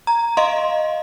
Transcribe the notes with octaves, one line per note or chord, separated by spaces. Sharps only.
A#5
D#5 F5 C6